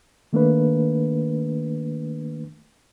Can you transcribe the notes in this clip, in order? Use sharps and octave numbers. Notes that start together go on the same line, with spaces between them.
D#3 A3 A#3 D4 B4